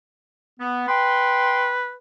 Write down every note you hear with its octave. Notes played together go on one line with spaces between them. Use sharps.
B3
B4 G5 C6